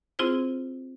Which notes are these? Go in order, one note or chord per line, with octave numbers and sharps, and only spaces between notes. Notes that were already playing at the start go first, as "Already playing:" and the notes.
C4 E4 F4 G#4 C5